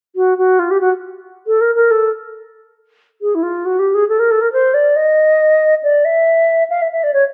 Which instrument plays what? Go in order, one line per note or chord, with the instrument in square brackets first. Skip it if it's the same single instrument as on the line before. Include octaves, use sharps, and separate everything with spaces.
[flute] F#4
F#4
F4
G4
F#4
A4
A#4
A#4
A4
G#4
E4
F4
F#4
G4
G#4
A4
A#4
A4
A#4
C5
D5
D#5
D5
E5
F5
E5
E5
D5
C#5